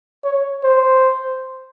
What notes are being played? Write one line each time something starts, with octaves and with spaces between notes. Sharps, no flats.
C#5
C5